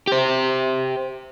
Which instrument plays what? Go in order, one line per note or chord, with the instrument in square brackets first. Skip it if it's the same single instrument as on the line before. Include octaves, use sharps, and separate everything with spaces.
[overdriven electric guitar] G4 C5